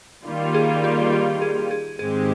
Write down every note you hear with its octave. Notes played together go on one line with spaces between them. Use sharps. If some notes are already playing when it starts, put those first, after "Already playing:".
D#3 G3 A#3 F4
G#4
G4
G4
G#4
G#4
G#2 D#3 G#3 C4 G4 G#4